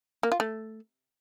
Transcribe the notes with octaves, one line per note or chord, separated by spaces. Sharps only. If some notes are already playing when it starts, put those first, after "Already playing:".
A#3
F4
A3